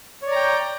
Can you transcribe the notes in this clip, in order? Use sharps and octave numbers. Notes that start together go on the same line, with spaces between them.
C#5 D5 G5 A#5